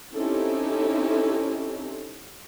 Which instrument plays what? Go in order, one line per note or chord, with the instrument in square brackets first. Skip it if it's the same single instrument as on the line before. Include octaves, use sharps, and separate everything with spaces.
[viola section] C4 C#4 D#4 E4 G4 A4